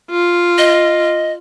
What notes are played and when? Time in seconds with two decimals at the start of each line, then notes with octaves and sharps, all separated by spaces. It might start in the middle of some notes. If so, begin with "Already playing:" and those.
0.11 F4
0.58 D#5